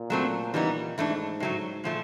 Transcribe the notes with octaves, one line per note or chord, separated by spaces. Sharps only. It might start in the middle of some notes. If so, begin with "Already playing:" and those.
Already playing: A#2
F#3 A3 C4
A#2 E3 G3 B3 D#4
G#2 E3 A3 D4
A2 F#3 A3
A#2 F3 A3